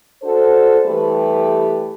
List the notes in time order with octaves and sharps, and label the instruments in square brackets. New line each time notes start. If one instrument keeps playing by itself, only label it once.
[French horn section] D4 F#4 A4 C5
E3 G3 A3 G4 B4